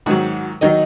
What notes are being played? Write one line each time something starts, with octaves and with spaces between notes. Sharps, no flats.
G#2 D#3 F#3 F#4 F#5
D#3 F#3 D#4 D#5